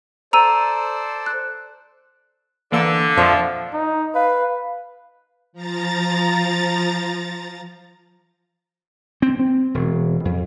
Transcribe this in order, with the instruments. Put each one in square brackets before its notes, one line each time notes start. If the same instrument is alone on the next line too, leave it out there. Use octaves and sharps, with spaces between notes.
[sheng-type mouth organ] A4 C5 D5 [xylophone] A#5 E6 D#7
[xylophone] F#6
[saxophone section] D3 [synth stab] E3 A#3 E6
[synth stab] F2 A#2 E5 [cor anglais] F3
[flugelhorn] D#4
[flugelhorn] B4 [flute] F5
[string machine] F3 A#5 A6
[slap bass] C4
C4
E1
F2